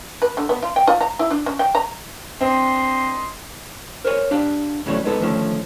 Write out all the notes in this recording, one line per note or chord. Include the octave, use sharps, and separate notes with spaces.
B4
D3
B3
F4
G5
F4
A#5
E4
D4
C#4
G5
A#5
C4 D4 D#5 C6
A#4 C5 C#5 G#5
D4 G4 F5
C#3 E3 F#3 G3 A3 C#4
G#3 A#3 B3 D#4 A4
D3 D#3 F3 A3 C#4